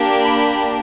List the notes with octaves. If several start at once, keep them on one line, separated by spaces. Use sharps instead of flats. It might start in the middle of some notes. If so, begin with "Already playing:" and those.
Already playing: A#3 D4 G4
B5